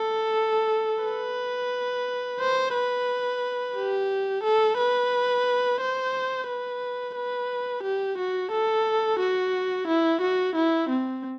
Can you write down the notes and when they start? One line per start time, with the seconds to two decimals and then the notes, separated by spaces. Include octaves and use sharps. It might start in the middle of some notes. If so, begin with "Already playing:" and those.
Already playing: A4
1.05 B4
2.40 C5
2.74 B4
3.76 G4
4.44 A4
4.78 B4
5.81 C5
6.48 B4
7.16 B4
7.83 G4
8.18 F#4
8.52 A4
9.20 F#4
9.88 E4
10.21 F#4
10.56 E4
10.90 C4